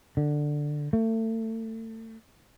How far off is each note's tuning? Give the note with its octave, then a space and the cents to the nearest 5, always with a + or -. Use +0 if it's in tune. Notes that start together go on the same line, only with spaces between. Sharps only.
D3 +10
A3 +30